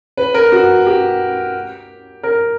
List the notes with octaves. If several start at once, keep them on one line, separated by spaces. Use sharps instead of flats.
B4
A#4
F#4
G4
A#4